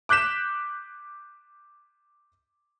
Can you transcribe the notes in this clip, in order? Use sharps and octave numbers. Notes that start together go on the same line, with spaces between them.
D6 F#6 G6 B6 E7